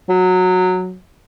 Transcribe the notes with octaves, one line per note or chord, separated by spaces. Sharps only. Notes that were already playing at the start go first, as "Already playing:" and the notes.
F#3